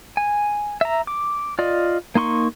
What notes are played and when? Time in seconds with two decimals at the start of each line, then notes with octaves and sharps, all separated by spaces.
0.17 G#5
0.81 E5 A#5
1.07 D6
1.59 F4 D5 D#5
2.15 A#3 D#4 C6 C#6